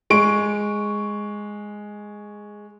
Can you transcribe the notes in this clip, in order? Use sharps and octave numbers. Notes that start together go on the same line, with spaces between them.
G#3 C#6 D7